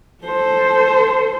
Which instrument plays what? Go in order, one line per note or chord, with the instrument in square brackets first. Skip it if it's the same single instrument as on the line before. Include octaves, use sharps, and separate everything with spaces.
[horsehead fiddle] A4 C5